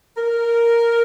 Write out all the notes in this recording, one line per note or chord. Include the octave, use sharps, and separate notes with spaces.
A#4